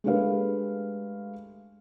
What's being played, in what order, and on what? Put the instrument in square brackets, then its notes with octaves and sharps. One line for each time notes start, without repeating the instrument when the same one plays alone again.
[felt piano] G#3 A3 D4 G4 B4 F5